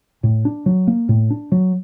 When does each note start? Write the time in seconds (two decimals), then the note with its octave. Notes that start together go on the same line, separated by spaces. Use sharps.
0.23 A2
0.45 D4
0.66 F#3
0.87 A#3
1.09 A2
1.30 D4
1.52 F#3